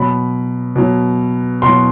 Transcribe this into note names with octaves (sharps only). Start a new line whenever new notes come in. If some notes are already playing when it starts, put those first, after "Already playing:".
Already playing: B2 F#3 B5
B2 F#3
B2 F#3 C6